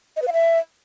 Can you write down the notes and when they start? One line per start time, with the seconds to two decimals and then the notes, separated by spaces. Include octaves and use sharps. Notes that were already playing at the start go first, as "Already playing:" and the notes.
0.16 D#5
0.22 B4
0.27 F5
0.33 E5